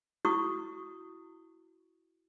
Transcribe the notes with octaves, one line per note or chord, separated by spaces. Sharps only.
E4 F#4 C#6 D#6